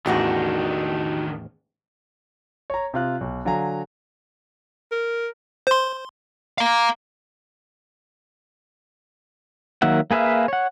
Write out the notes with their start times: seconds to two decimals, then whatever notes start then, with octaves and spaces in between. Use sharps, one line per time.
0.06 A1 E2 D#3 D4 D#4 F#4 G4
2.70 C#5 A#5
2.94 C3 F4 F#6
3.21 B1
3.45 D3 F#3 F5 G#5 A#5
4.92 A#4
5.67 C5 C6
6.58 F5 A#5
9.82 D#3 F#3 A#3 E5 F#5
10.11 A#3 G#4 B4 E5 F5
10.48 C#5 F#5